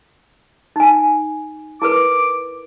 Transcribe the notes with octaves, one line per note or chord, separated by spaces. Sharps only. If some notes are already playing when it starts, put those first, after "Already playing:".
D#4 G#5
E4 A#4 B4 D6